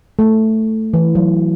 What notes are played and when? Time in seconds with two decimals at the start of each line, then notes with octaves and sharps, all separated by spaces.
0.19 A3
0.94 E3
1.15 F#3